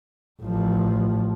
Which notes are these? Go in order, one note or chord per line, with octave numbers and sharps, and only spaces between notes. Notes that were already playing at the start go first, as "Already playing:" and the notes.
A1 F3